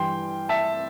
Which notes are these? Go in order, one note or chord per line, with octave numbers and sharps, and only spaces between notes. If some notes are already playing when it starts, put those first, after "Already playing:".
Already playing: G2 E3 G5 C6
E5 A5